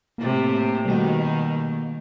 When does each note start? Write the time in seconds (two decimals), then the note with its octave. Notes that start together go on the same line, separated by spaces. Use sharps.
0.18 A2 C3 A#3
0.85 B2 D#3 G3 A3 F#4